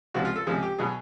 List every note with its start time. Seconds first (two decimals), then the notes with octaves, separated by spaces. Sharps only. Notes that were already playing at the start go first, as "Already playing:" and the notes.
0.14 C#2 C3 F3 F#4
0.25 F4
0.36 A4
0.47 C#2 C3 F3 G#4
0.63 G4
0.79 B2 F#3 G#4